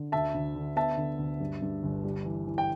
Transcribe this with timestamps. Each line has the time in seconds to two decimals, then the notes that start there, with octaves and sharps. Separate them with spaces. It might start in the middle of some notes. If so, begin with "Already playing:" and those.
Already playing: D3
0.12 D2 E5 A5
0.34 D2
0.55 D3
0.76 B3 E5 A5
0.97 D3
1.19 D2
1.40 G2
1.62 G2
1.83 G1
2.04 G3
2.25 E3
2.47 E3
2.58 G5